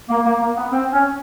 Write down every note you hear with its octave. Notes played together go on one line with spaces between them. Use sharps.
A#3
A#3
A#3
B3
C4
C#4